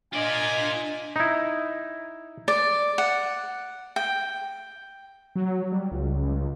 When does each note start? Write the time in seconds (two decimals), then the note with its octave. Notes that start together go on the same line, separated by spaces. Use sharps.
0.13 D4 F4 D5 D#5 G#5
1.16 D#4 E4
2.48 D5
2.98 F#5
3.96 G5
5.35 F#3
5.72 G3
5.91 C#2